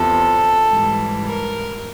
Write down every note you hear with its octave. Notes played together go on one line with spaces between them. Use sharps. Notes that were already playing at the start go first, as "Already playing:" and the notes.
Already playing: E2 C3 F3 A4
G#2 E3 G3
A#4